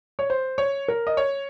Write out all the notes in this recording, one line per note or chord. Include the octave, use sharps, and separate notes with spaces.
C#5
C5
C#5
A#4
D#5
C#5